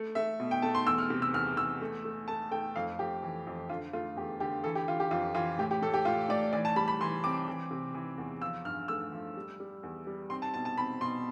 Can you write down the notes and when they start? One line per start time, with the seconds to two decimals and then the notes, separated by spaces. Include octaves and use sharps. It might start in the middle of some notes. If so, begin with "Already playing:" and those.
Already playing: A3
0.15 A3 E5
0.40 B2
0.51 G5
0.62 A3 A5
0.75 C6
0.86 E2 E6
0.98 F6
1.10 C3
1.22 E6
1.34 E2 F6
1.57 E2 E6
1.81 A3
2.05 A3
2.28 A3 A5
2.51 A3 G5
2.76 F2 F5
2.99 F2 G4
3.23 E3
3.47 F2
3.69 D3 F4
3.93 A3 F4
4.16 E2 G4
4.40 D3 G4
4.64 E3 A4
4.75 G4
4.88 E3 F4
5.00 G4
5.11 F2 F4
5.34 E3 F4
5.58 A2 G4
5.71 G4
5.82 A2 A4
5.94 G4
6.05 A2 F4
6.29 A2 D5
6.53 E3 D5
6.65 A5
6.76 G3 B5
6.88 B5
7.01 E3 C6
7.24 C4 D6
7.48 E3
7.71 C3
7.94 E3
8.18 E2
8.41 F3 E6
8.65 G2 F6
8.88 A3 E6
9.12 F3
9.36 G3
9.60 G3
9.83 E2
10.07 G3
10.30 C4 C6
10.42 A5
10.54 B2 A5
10.65 A5
10.77 C4 B5
11.01 B2 C6